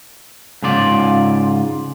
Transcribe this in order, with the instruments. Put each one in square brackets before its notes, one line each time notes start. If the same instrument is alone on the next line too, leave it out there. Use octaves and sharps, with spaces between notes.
[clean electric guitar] G#2 C#3 F4 D5